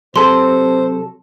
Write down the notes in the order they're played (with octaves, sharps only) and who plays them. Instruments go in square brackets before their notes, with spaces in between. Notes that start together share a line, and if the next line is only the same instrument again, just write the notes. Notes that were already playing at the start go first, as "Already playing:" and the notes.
[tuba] C3 [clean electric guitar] F#3 A4 [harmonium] C5 [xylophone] C6